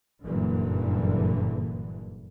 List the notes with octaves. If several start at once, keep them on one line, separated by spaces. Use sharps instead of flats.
F#1 G2 A#2 D3 E3